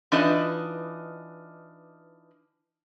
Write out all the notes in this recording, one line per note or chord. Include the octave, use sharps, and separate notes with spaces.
E3 D4 D#4 F4 B4 D#5